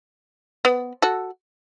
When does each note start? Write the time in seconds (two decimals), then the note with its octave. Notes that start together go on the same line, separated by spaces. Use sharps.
0.65 B3
1.02 F#4 A4